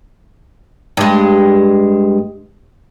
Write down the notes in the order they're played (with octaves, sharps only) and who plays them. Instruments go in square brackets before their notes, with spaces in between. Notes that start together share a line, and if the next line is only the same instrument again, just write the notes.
[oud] G2 G#3